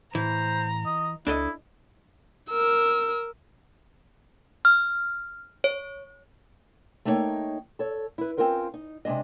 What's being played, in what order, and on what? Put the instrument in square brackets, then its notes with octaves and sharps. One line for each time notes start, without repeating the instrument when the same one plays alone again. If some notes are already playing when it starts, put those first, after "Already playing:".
[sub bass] A2 [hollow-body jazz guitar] E3 [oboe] C5 [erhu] A#5
[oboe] D#5
[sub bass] C#2 [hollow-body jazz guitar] D4 A4 D#5 [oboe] E4
[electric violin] A#4 E6
[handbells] F6
C#5
[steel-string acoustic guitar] A3 A#3 D#4 F#4 C#5 G5
A4 C#5
E4 B4
C4 C#4 F4 A#4 C5
D#4
C3 D#3 G#3 D4 D#5